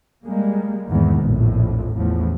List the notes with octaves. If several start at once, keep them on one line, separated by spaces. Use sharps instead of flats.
G3 G#3 A#3
E2 G#2 D#3 G#3 B3
A#1 F2 A2
A1 E2 A2 F3